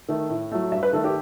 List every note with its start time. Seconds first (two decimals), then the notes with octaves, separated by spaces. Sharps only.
0.09 D#3 A3
0.30 A2
0.52 F#3 A3
0.71 G2 E5
0.83 B4
0.93 D#3 A3 A4
1.04 G4